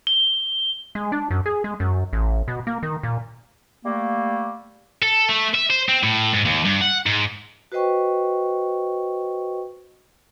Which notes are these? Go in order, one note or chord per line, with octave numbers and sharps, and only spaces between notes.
G7
G#3
D4
F#2
G#4
G#3
F#2
A1
B2
A#3
D#3
A#2
G3 A3 A#3
A4
A3
E5
C5
C4
A2
G#2
D#2
G2
F#5
G#2
F#4 B4 C5 D#5 G5 C#6